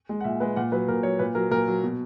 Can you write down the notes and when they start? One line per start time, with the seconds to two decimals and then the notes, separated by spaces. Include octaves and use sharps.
0.09 G#3
0.20 F#5
0.24 A#2 E5
0.40 G#3 B4
0.56 A#2 F#5
0.72 F#3 B4
0.88 A#2 A#4
1.03 F#3 C#5
1.19 A#2 B4
1.35 F#3 A#4
1.51 A#2 A#4
1.68 F#3
1.83 B2